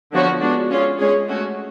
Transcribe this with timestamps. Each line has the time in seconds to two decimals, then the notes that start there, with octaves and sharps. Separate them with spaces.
0.12 D3 F3 B3 F#4 C#5
0.41 G#3 B3 D4 F#4
0.70 C#4 F4 G#4 C#5
0.99 G#3 C#4 G#4 C#5
1.28 A3 C#4 F#4